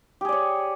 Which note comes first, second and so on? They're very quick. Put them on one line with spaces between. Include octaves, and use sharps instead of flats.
G4 G#4 D5 C#5